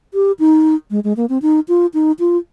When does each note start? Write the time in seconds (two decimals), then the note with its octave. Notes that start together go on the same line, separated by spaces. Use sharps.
0.14 G4
0.39 D#4
0.91 G#3
1.04 G#3
1.17 A#3
1.29 C4
1.42 D#4
1.68 F4
1.94 D#4
2.19 F4